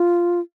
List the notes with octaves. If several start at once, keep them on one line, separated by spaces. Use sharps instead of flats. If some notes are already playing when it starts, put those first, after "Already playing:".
Already playing: F4